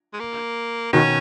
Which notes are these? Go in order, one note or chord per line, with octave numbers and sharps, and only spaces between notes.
G#3
A#3
B2 D#3 C#4